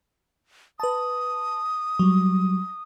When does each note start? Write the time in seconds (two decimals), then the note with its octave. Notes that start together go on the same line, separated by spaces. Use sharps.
0.80 B4 A5 D#6
1.99 F#3 G3